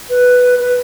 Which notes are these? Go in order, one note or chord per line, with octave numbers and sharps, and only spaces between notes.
B4
B4